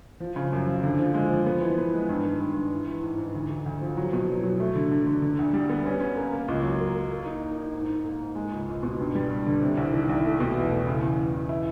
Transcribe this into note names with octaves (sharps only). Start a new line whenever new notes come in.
F3
C#3
F#2
F3
D3
F3
G#3
F3
B3
E3
B3
G#3
G2
D#3
G2
G2
E3
E3
G#2
G#2
D2
D2
D2
F3
F#3
B2
F#3
F#3
A3
D3
D3
D3
D3
D2
G3
B3
C#4
C#4
A#3
A#3
C#2
F#3
A#3
A#3
A#3
D#4
D#4
D#4
G#2
G#2
A#3
G#2
G#3
C#2
C#2
B2
G2
G3
G2
D3
C3
C2
D#3
C2
A3
B2
E2
A3
C#3
E2
E2
E2
E4